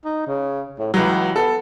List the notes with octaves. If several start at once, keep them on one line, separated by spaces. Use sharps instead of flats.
D#4
C#3
A2
C#2 E3 F#3
B3 A4